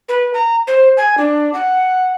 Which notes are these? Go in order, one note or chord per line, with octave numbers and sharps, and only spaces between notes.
B4
A#5
C5
G#5
D4
F#5